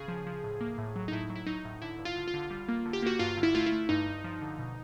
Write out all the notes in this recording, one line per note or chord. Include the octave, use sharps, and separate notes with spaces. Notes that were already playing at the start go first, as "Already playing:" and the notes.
Already playing: C#3 G#4
F3
F3
A2
A#3
A2
F#3
D#4
A2 E4
F#3
E4
F#3 D#4
A2
D3 E4
G2
F4
D3
F4
D3
G3
A#3
D3
G4
A#3 F#4
G2 F4
D3
E4
A3 F4
E4
A3
G2 D#4
G2
F3
D3
B2